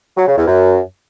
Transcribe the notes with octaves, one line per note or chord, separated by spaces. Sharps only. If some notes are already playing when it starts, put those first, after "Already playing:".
F#3
C#3
E2
F#2